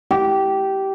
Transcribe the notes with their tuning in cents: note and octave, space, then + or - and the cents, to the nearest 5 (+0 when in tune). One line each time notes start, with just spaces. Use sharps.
G4 -15